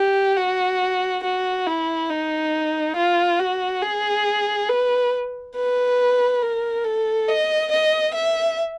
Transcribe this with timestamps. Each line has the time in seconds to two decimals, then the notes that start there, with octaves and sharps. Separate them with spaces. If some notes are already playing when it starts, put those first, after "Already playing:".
Already playing: G4
0.37 F#4
1.24 F#4
1.67 E4
2.10 D#4
2.97 F4
3.39 F#4
3.82 G#4
4.69 B4
5.56 B4
6.42 A#4
6.85 A4
7.29 D#5
7.72 D#5
8.14 E5